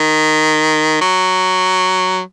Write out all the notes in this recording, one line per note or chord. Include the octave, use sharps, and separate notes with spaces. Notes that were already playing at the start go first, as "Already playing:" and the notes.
Already playing: D#3
F#3